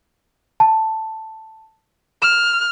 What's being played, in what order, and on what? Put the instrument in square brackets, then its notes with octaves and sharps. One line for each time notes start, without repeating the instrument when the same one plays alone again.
[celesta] A5
[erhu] F6 [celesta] E7